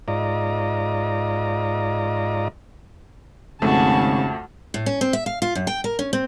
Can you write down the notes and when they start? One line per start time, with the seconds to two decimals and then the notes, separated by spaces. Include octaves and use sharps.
0.08 G#2 F4 D5 D#5 A#5
3.62 G#1 F2 C#3 A3 F#4 A5
4.74 A2
4.86 C#4
5.01 C4
5.13 E5
5.26 F5
5.42 F4
5.55 F#2
5.67 G5
5.84 A#4
5.99 C#4
6.13 C4